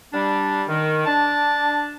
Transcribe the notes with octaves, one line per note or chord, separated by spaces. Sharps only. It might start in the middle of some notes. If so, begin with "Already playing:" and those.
G3 D4
D#3
D4 A5